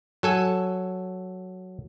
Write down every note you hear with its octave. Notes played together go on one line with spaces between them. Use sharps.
F#3 A4 G#5